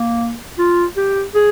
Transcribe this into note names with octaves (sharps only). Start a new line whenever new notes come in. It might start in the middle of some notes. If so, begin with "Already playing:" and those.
Already playing: A#3
F4
G4
G#4